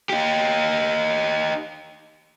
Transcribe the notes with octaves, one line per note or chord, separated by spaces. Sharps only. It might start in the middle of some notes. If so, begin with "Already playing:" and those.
D#4 G4